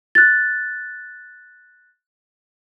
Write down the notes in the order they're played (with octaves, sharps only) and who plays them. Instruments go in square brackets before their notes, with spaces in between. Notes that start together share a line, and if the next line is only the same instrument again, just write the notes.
[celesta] F#6 A6